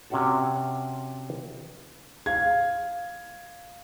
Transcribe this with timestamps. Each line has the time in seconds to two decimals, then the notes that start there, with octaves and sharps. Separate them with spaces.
0.10 C3 C#4 F#4 F#5 A5
2.26 F5 G#6